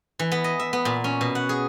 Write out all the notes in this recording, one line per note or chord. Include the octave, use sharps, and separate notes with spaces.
E3
B3
D#5
E5
B3
A#2
C#4
B2
F#5
G#4